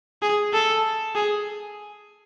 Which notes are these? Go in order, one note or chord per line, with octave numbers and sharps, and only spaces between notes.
G#4
A4
G#4